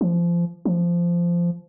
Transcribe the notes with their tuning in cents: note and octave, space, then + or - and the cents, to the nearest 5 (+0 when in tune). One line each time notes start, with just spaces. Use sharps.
F3 -25
F3 -15